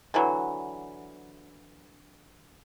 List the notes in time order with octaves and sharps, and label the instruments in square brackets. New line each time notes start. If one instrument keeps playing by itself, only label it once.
[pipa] D3 E3 F#3